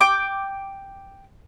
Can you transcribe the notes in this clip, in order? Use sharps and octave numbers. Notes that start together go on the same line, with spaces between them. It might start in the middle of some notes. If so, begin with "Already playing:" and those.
G5 D6